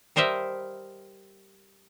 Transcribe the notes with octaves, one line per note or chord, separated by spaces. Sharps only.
G3 A#4 C5 D#5 E5